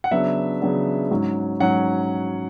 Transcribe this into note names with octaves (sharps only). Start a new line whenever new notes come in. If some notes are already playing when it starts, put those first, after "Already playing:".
F#5
C#3 F#3 B3 D4 E5
C#3 F#3 B3 D4
G#2 F#3 C#4
G#2 F#3 C#4 F#5